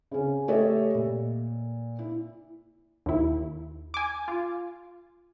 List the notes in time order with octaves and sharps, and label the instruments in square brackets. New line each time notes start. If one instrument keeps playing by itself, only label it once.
[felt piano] C#3 C#4
A3 G4 A4 C#5 D#5 E5
A#2
E4
[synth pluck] D#2 E4
G#5 D6
F4